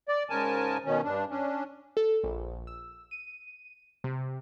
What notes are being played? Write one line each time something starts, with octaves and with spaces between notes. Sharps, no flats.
D5
G#2 C#3 A#4 G#5 A5
B2 D#3 C#4
G2 D4
C#4 D4
A4
A#1
E6
D#7
C3